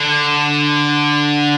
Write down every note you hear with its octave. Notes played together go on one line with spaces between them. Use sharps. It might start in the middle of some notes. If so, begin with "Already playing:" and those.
Already playing: D3